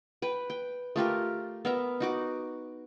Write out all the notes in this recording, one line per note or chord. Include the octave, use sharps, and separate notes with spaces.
B4 G5
G5
A3 F4 G4 A#4
B3 A#4 E5
D#4 F#4 D6